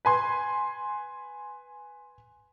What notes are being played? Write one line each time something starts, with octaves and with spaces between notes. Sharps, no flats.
B4 G#5 C6